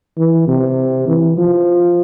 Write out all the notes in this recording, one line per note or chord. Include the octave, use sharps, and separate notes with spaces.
E3
C3
E3
F3